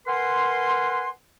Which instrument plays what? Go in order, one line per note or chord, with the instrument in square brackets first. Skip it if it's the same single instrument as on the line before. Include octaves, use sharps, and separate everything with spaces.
[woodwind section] A#4 B4 F#5 G#5 C6